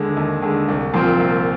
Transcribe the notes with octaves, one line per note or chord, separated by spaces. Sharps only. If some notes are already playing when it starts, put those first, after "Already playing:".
Already playing: D#2 D3 G#3
D#2
D3 G#3
C2
A#2 F3 C4 F4
C2